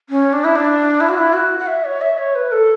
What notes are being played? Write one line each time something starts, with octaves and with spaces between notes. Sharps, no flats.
C#4
D4
E4
D4
E4
F#4
E4
F#4
F#5
E5
C#5
E5
C#5
B4
A4